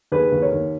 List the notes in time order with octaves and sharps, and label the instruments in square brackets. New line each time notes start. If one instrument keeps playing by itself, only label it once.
[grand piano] D#2 G#4 B4
D#2
A#4 C#5
D#2